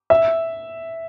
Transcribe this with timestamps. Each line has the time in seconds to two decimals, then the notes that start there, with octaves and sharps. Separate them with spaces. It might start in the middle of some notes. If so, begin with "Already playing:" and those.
0.10 E5